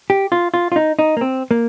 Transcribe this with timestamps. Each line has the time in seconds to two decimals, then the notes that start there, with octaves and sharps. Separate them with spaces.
0.10 G4
0.32 F4
0.54 F4
0.72 F4
0.76 D#4
0.99 D#4
1.17 A#3
1.21 C4
1.51 A#3